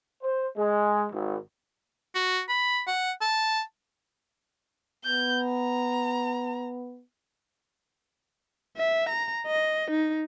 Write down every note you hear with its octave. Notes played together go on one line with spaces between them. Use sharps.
C5
G#3
G#1
F#4
B5
F#5
A5
B3 G6
A#5
E5
A#5
D#5
D#4